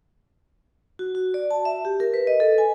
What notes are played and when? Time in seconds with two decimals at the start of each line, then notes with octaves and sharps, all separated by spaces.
0.99 F#4
1.15 F#4
1.34 D5
1.51 A5
1.65 E5
1.85 G4
2.00 A#4
2.14 B4
2.27 D#5
2.40 A4
2.58 G#5